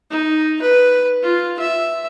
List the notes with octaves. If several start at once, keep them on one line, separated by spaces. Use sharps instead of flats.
D#4
B4
F4
E5